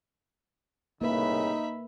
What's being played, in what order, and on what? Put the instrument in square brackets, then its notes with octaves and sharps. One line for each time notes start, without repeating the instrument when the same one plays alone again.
[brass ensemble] C2 A2 C#3 [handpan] A#3 B4 [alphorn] D#4 [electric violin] E5 B5